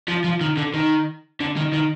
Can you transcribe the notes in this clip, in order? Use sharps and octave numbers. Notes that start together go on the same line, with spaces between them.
F3
F3
D#3
D3
D#3
D3
D#3
D#3